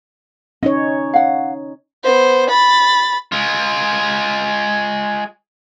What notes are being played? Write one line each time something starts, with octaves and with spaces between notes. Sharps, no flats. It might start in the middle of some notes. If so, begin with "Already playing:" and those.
C#4 D#4 C#5 D#5
F5 F#5
B3 C5
B5 A6
G#3 F4